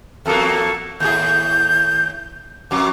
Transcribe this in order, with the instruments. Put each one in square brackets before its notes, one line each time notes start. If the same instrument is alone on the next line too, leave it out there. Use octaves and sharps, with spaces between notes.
[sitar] E2 F#3 A#3 [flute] A4
[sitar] D#2 A2 G#4 [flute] G6
[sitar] F2 F#3 [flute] D6